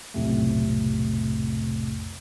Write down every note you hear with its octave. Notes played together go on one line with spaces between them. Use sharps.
B1 F2 A2 C3 A3